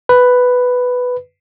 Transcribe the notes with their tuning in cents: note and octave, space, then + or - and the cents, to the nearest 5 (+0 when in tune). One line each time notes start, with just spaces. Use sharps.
B4 +5